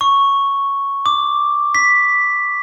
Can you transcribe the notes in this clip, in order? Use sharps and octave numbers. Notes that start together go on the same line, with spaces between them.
C#6
D6
B6